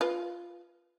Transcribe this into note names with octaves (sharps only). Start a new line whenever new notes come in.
F4 B4